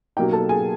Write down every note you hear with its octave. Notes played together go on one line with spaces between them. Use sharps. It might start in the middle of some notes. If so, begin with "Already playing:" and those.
B2 F#3 A#3 D#4 G4 G5
A4 A5
G#4 G#5